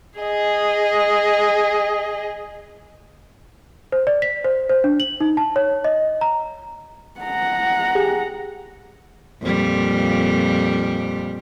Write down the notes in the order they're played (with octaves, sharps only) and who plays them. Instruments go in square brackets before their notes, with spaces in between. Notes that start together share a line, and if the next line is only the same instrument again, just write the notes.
[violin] G#4 D#5
[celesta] C5
D5
B6
C5
C5
D4
F#7
D#4
A5
C#5
D#5
A#5
[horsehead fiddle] F#5 A#5
[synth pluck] G4 G#4
[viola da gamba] F2 A#2 G3